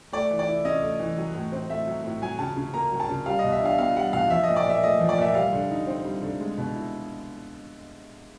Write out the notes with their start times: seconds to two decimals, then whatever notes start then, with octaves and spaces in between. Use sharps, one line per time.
0.13 A3 D5
0.30 E3
0.39 D5
0.48 E4
0.65 C#4 D#5
0.82 A3
1.00 E3
1.18 F#3
1.35 A2
1.52 C4
1.69 A3 E5
1.87 F#3
2.04 A2
2.22 F#3 G#5
2.39 C#3 A5
2.57 C#3
2.74 A#3 A#5
2.92 F#3
3.00 A5
3.09 C#3
3.26 G3 F5
3.39 D#5
3.44 B2
3.52 E5
3.61 D4 F5
3.78 B3 F5
3.95 G3 F#5
4.13 B2 F5
4.30 F3 E5
4.44 D#5
4.49 A#2
4.56 D5
4.66 A#2 E5
4.83 A3 D#5
5.00 F3
5.09 D5
5.18 A#2 E5
5.35 G3 F5
5.53 D3
5.71 D#4
5.87 C4
6.05 G3
6.22 D3
6.40 G#3
6.58 B2
6.75 E4